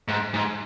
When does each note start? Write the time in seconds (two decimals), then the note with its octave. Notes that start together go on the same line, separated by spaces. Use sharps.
0.08 G#2
0.34 G#2